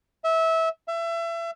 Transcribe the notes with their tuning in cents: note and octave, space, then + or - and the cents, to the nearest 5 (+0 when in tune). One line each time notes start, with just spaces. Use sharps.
E5 -20
E5 +30